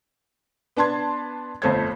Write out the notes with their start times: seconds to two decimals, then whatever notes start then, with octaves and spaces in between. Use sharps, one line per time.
0.77 B3 D4 A5 C6 G#6
1.62 G1 F2 A3 C5 G#6